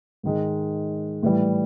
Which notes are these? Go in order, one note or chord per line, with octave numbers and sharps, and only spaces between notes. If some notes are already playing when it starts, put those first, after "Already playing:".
G#2 D#3 G#3
A2 E3 G3